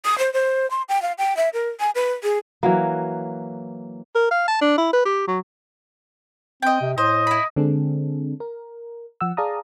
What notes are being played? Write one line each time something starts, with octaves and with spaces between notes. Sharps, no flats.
D#6
C5
C5
C6
G5
F5
G5
E5
A#4
G#5
B4
G#4
E3 F#3 A#3
A#4
F5
A5
D4
E4
B4
G4
F#3
C4 D#5 G5
C3
A2 C5 D#5
E4 B5
D3 G#3 C4 D4 G#4 A4
A#4
F3 F#5 E6
G#4 D5 F5 A5 A#5 D#6